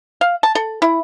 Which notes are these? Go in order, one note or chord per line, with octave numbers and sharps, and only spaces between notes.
F5
A5
A4
E4